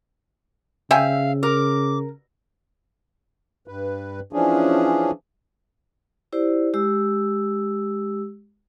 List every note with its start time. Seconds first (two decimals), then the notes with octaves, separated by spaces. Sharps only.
0.91 C#3 C5 E5 F5 G5 G#5
1.43 A#4 D6
3.68 G2 B4
4.33 E3 F3 C#4 D4 G#4
6.32 E4 G4 C5 D5
6.74 G#3 G4 E6